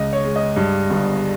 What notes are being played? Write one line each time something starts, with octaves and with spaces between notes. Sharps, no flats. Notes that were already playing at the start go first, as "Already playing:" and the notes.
Already playing: C#2 D#5
C#5
G#3
D#5
G2
G1